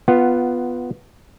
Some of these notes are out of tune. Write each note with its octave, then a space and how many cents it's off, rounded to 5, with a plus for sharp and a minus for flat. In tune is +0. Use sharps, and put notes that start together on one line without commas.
B3 +0 F4 +0 F#5 +15